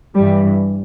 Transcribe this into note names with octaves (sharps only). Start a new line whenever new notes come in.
G2 E3 G3